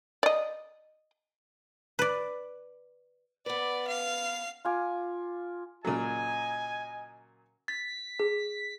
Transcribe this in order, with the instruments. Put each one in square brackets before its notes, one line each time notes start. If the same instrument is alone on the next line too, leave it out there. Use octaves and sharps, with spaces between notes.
[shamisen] D5 D#5
[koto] B4 D5
[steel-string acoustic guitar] B3 B4 [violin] D5
[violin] F5 C7
[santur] F4 G#5 D6
[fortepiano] A#2 C#3 F#3 [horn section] D#5 G#5
[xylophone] A6 [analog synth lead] B6
[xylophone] G#4